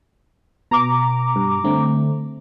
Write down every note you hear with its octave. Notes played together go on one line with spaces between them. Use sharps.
B2 A#5 D6
G2
D3 A3 C4